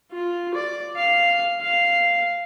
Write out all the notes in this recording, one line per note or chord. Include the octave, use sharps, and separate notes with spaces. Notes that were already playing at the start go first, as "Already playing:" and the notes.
F4
D5
F5
F5